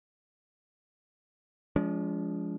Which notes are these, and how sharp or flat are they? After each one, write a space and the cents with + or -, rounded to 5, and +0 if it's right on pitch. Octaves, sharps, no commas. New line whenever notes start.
F3 -10 G#3 +0 D4 -45